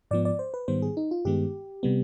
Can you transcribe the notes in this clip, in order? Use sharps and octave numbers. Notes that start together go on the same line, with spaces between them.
G#2 F3 B3 D5
D5
C5
B4
G#2 D#3 G3 B3 C5
G#4
D#4
F4
G2 D#3 G#3 B3 G4
C3 G3 B3